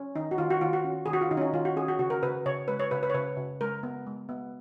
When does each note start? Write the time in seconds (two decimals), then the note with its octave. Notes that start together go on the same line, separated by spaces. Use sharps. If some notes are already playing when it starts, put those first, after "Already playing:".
Already playing: C#4
0.16 D#3 D#4
0.31 F#4
0.38 D#3 F4
0.50 F#4
0.61 D#3 F4
0.73 F#4
0.84 C#4
1.06 D#3 G#4
1.13 F#4
1.21 F4
1.31 D#3 D#4
1.37 C#4
1.41 D#4
1.53 D#3 F4
1.65 F#4
1.76 C#4 G#4
1.88 F#4
1.99 C#3 F#4
2.10 A#4
2.23 C#3 B4
2.46 C#3 C#5
2.68 G#3 B4
2.80 C#5
2.91 C#3 B4
3.03 B4
3.10 C#5
3.14 C#3 B4
3.37 C#3
3.61 G#3 A#4
3.83 B3
4.07 G#3
4.29 B3